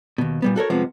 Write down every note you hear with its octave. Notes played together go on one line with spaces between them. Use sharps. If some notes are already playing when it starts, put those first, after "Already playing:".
D#2 B2
A#2 G3 B3
F#4 A4 A#4 C#5
F2 C3 F3 G#3 B3